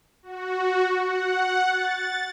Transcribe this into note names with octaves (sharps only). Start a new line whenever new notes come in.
F#4
F#5
A6